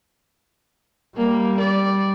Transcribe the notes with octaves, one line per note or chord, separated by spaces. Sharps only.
G3 A#3
D5